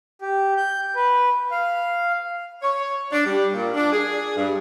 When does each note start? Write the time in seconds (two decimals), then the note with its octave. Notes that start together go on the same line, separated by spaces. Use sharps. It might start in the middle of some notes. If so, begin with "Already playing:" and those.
0.21 G4
0.57 G6
0.95 B4
1.51 F5
2.61 C#5
3.11 D4
3.25 G3
3.53 A#2
3.74 D4
3.92 G#4
4.36 G2